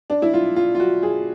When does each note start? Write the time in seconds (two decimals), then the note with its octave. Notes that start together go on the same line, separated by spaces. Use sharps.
0.10 D4
0.22 E4
0.34 F4
0.56 F4
0.75 F4
0.80 F#4
1.03 G#4